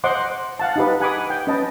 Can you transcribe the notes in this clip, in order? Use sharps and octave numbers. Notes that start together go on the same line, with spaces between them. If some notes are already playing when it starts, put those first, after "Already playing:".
C5 D#5 F#5 C6 D6
F5 F#5 A5
D#4 G4 B4
F#5 G#5 B5 D6 D#6
G5
C#4 B4 D#5 A5